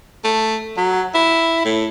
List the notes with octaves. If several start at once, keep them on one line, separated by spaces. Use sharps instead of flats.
A3
F#3
E4
A2